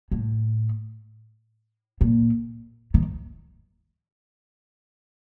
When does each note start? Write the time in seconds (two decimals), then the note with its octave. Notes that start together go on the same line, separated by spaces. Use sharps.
0.12 A2
2.01 A#2
2.94 D#3